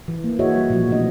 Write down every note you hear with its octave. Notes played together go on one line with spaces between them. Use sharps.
E3
A#3
E4 F#4 G#4 C#5 D#5 E5
G3
A#2 F3
B2 E3 A3 D4 D#5